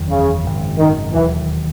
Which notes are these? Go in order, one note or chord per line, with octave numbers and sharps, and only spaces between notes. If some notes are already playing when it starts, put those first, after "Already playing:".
Already playing: F#1 E2 D#3 F#3
C#3
G#1 F#2 C#3
D#3
E1 D#2 D#3 E3 F#3